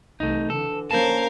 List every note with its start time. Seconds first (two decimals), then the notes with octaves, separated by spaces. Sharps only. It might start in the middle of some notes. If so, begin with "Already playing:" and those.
0.20 C2 E3 A3 D#4
0.50 D3 E3 A4
0.91 A#3 C#4 A#4 C5 F5 A5